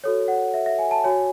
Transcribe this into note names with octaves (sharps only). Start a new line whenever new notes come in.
F#4 A4 C#5
F#5
E5
E5
G#5
A5
F#4 C#5 G#5